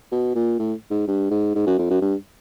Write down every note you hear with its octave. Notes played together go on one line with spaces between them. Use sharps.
B2
A#2
A2
G#2
G2
G#2
G#2
F#2
F2
F#2
G2